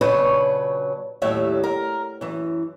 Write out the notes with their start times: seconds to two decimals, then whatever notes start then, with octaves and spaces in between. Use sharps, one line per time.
0.01 A#2 C#3 F#3 D4 B4 C#5
1.22 D#2 A2 F#3 G3 E5
1.64 A#4
2.21 F#2 E3